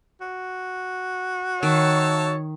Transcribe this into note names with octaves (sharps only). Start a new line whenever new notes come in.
F#4
D#3 C#5 E5 A5